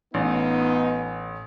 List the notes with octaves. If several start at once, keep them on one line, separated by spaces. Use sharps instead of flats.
A1 B3 D#4 F4